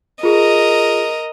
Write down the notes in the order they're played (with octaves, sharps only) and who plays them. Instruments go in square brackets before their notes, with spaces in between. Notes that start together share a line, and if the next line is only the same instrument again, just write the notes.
[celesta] F4 G#4 [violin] A#4 D#5